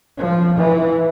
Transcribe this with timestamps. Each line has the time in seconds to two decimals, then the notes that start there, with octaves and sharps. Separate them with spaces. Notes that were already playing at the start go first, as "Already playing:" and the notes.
0.16 F3
0.56 E3